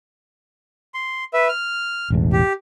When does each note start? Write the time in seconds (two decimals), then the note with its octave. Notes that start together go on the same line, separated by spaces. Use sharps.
0.94 C6
1.33 B4 E5
1.49 F6
2.10 E1 A1 E2
2.33 G4